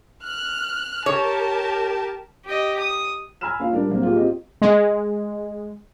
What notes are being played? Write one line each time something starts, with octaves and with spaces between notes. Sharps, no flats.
F6 F#6
G4 A#4 C#5 A5
G4 D#5
D#6
G#5 A#5 B5 E6 F6 E7
A#3 C#4 F4 F5
G3 D4 A#4
F#3 A#3 C4
A#3 F4 G4 G#4
C4 F4 G4 D#5
G#3